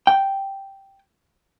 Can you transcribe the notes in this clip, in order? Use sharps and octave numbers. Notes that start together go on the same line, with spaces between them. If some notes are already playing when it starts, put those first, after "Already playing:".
G5